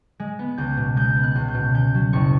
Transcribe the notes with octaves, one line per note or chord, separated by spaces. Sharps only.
G#3
B3
C#2 G6
B2
G#3 G6
B3
F#6
C#2
G6
B2
C#3 G6
F#3
F#1 C#6